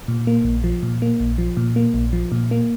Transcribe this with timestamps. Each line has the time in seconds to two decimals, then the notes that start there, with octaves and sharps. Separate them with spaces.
0.08 A#2
0.27 A#3
0.45 A#1
0.64 F3
0.83 A#2
1.02 A#3
1.20 A#1
1.38 F3
1.57 A#2
1.76 A#3
1.94 A#1
2.13 F3
2.32 A#2
2.51 A#3